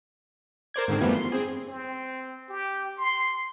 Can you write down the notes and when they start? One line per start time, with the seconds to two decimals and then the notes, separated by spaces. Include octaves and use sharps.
0.74 A#4 C5 D5 G#6
0.88 G#2 D3 D#3 C4
1.00 F#2 E3 F3 G3 A3 B3
1.15 C6
1.32 C4 G#4
1.68 C4
2.49 G4
2.98 C6